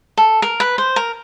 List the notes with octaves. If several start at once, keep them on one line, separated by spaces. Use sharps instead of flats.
A4
A#4
B4
C5
A#4